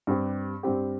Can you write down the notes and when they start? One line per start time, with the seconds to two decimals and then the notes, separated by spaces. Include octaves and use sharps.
0.07 G2 G3 C4 G4
0.63 G2 G3 C4 G4